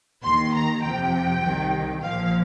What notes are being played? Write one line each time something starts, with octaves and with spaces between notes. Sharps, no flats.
D#2 D#3 C6
A#5
F2 C3 F3 G5
C2 C3 D#3
A#1 A#2 F3 F5